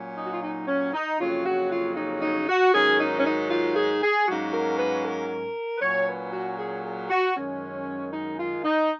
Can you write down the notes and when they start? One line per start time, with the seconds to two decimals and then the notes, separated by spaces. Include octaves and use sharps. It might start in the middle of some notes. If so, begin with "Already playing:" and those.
Already playing: A#2 F#3 C#4
0.17 D#4
0.26 F#4
0.33 F4
0.43 D#4
0.68 C#4
0.94 D#4
1.20 F2 C#3 F#3 A#3 C#4 F4
1.45 F#4
1.71 F4
1.96 D#4
2.22 D#4
2.48 F#4
2.74 G#2 D#3 F#3 C#4 G#4
3.00 D#4
3.19 C#4
3.25 D#4
3.51 F4
3.76 G#4
4.02 G#4
4.28 G#2 F#3 A#3 C#4 F#4
4.53 A#4
4.79 B4
5.04 A#4
5.77 B4
5.82 A#2 F#3 C#4 C#5
6.08 B4
6.33 F#4
6.59 G#4
6.85 G#4
7.10 F#4
7.36 F#2 D#3 G#3 C#4
8.13 D#4
8.39 F4
8.64 D#4